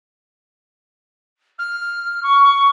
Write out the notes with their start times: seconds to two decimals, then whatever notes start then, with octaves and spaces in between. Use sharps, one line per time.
1.58 F6
2.23 C#6